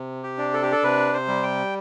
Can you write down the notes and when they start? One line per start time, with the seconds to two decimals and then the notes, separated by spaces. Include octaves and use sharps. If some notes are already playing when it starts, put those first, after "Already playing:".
Already playing: C3
0.23 G4
0.38 D4
0.53 A4
0.63 G4
0.72 A4
0.83 C3 B4
1.13 C5
1.28 G3
1.43 G5